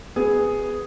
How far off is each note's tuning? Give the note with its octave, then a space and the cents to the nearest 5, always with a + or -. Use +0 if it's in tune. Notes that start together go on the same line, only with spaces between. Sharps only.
B3 +0 G#4 +0